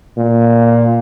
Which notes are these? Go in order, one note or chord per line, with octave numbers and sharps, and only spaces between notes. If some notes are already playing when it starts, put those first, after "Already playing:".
A#2